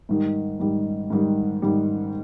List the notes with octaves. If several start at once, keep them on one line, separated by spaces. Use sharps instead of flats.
G#2 D#3 G3
G#2 D#3 G3
G#2 D#3 G3
G#2 D#3 G3